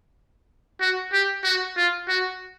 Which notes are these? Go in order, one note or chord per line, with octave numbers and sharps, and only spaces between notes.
F#4
G4
F#4
F4
F#4